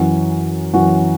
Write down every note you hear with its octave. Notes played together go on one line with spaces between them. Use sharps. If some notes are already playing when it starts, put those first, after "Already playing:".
Already playing: F#2 E3 C#4 F#4
F#2 E3 C#4 F#4